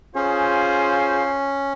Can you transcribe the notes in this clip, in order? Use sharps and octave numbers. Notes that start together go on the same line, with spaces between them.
C#4 F4 G#4 C5